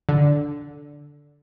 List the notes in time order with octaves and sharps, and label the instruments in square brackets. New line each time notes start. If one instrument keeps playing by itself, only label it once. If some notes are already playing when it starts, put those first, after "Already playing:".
[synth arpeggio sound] D3